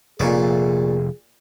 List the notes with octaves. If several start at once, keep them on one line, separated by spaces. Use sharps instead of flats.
F1 A#2 G#4 C#5 D5